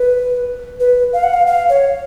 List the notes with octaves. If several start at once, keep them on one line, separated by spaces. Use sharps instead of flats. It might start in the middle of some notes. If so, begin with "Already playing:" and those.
Already playing: B4
B4
F5
F#5
F5
F5
C#5